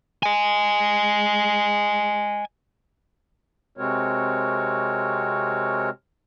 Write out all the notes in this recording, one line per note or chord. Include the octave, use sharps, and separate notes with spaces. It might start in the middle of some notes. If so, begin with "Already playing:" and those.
D#5 G#5
C3 G#3 C4 F#4 A#4 C#5